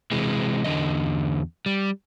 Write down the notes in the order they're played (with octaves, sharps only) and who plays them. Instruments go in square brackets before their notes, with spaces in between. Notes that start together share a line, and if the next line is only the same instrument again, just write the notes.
[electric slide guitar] C3 E3 G#3
E2 D3 F3 D#5
G3